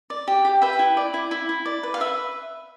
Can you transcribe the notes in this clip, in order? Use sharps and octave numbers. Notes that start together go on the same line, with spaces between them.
D5
G4
G4
B4 E5 G5
E4
D5
E4
E4
E4
D5
B4
F5
B4 E5